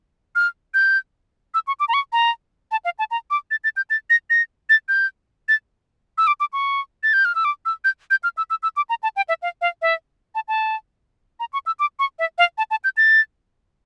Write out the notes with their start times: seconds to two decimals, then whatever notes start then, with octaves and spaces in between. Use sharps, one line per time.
0.35 F6
0.74 G6
1.54 E6
1.67 C#6
1.80 D6
1.89 A#5
1.94 C#6
2.13 A#5
2.72 A5
2.85 F5
2.99 A5
3.11 A#5
3.31 D6
3.51 A6
3.64 A6
3.77 G6
3.90 A6
4.10 A#6
4.30 A#6
4.70 A6
4.89 G6
5.49 A6
6.18 E6
6.27 D6
6.40 D6
6.53 C#6
7.03 A6
7.13 G6
7.25 F6
7.35 E6
7.45 D6
7.65 E6
7.85 G6
8.11 G6
8.23 F6
8.37 E6
8.50 E6
8.63 E6
8.77 D6
8.89 A#5
9.03 A5
9.16 G5
9.29 E5
9.42 F5
9.61 F5
9.82 E5
10.35 A5
10.48 A5
11.40 A#5
11.53 C#6
11.66 E6
11.80 D6
11.99 C#6
12.19 E5
12.38 F5
12.58 A5
12.71 A5
12.84 G6
12.97 A6